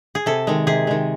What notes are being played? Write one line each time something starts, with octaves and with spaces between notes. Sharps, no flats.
G#4
C3 A4
D#3 G#3
C3 G#4
D#3 G#3